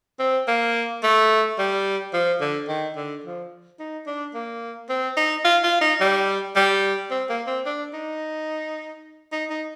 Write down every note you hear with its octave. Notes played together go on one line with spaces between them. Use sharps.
C4
A#3
A3
G3
F3
D3
D#3
D3
F3
D#4
D4
A#3
C4
D#4
F4
F4
D#4
G3
G3
C4
A#3
C4
D4
D#4
D#4
D#4